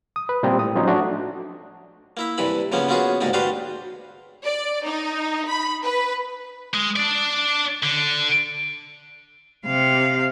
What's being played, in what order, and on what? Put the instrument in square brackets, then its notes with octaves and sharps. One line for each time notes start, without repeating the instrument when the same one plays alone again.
[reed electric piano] D#6
B4
A#2 G3 A#3 C4
A2 D#6
F3 F#3 C#4 D#4
A3 D4 F#4
[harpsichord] A#3 E4 E5
G2 C3 E3 B5
C#3 F3 A#3 B3 C#4
B3 C#4 F4 F#4 G#4
D2 G#2 C3 A#3 D#4
D4 F#4 G4 B4 C5 F5
[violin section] D5
D#4
B5
B4
[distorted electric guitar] G#3
D4 D5
D3
[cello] C3 F5